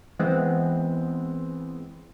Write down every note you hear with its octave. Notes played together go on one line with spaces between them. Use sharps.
E3 G#3 B3 C4